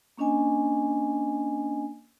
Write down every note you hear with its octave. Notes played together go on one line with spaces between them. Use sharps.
A#3 C#4 D4 D#5 G#5